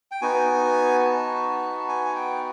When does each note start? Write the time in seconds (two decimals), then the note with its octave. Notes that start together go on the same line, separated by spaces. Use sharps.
0.11 G5
0.22 B3 D#4 F#4 G#5
1.05 A5
1.88 G#5
2.15 G5